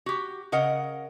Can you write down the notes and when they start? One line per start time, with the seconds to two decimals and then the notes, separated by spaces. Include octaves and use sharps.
0.06 F#4 G4
0.52 C#3 A#4 D#5 F#5